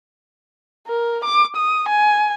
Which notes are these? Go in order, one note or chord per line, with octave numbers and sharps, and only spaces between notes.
A#4
D6
D#6
G#5